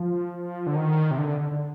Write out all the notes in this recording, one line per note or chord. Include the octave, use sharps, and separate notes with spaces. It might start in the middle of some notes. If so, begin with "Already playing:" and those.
Already playing: F3
D3
D#3
C3
D3
D3